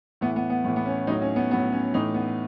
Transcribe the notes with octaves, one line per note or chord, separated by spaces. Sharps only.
A2 E3 B3
B3
B3
A2 E3
B3
C#4
A2 F#3 D#4
C#4
B3
A2 F#3 B3
C#4
A2 E3 D#4
B3